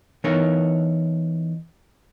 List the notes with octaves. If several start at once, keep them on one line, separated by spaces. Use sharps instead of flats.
E3 B3 D#4 A#4 C#5